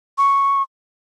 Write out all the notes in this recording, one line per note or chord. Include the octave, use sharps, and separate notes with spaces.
C#6